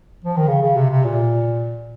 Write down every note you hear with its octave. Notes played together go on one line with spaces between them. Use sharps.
F3
D#3
C#3
C#3
C3
C3
A#2